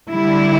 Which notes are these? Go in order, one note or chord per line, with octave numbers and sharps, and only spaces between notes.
D3 G3 E4